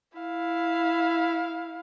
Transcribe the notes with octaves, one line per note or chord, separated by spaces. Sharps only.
E4 F5